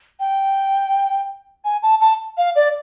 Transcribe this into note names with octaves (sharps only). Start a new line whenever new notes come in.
G5
G#5
A5
A5
F5
D5